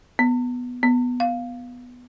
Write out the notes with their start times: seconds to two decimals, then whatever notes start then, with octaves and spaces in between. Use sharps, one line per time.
0.19 B3
0.83 B3
1.20 F5